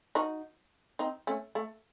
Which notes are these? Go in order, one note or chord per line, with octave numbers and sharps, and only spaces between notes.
D#4 F#4
C4 D#4
A3 C#4
A3